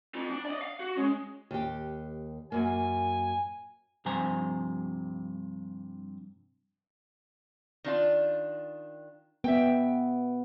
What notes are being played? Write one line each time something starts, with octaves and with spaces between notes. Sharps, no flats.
C4 F4
D4
D5 D#5
F5
F#4
G#3 C#4
D#2 G4
F#2 A#3 G#5
G2 C3 F3 C5 G#5 A#5
D#3 D4 F4
B3 E5 G5